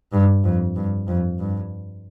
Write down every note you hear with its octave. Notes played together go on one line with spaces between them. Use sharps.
G2
F2
G2
F2
G2